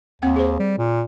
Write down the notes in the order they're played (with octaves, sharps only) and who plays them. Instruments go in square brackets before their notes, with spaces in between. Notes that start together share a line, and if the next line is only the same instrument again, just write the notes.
[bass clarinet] D#2 [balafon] C4 F#5 G5
[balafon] G#4 C5
[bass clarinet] G3
A#2